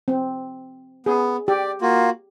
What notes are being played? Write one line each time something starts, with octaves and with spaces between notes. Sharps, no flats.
C4
B3 G#4
G4 D5
A#3 F4 F#4